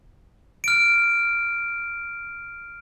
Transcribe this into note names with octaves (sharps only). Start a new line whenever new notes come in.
F6 D7